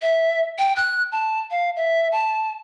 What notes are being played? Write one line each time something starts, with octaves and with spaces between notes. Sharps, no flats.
E5
G5
F#6
A5
F5
E5
A5